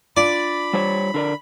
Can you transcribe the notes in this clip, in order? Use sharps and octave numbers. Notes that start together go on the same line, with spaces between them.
D4 F4 D5 B5
G3 C5 C#5
D3 A#4 D5